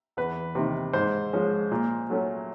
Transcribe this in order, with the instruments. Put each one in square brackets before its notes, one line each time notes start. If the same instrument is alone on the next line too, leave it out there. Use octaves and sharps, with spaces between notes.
[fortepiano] E2 B4
C3 D#3
G#2 C5
F3 G#3 C#4
A#2
F#3 A3 C#4